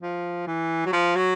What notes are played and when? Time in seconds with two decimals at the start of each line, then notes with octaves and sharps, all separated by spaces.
0.02 F3
0.47 E3
0.86 F#3
0.93 F3
1.16 F#3